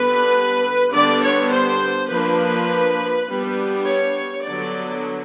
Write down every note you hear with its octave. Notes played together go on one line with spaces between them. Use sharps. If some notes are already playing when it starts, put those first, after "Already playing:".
Already playing: D3 G3 B3 B4
D3 G3 B3 D4 D5
C#5
C5
F3 A#3 D4 B4
G3 B3 D4
C#5
D3 F#3 B3 D4 D5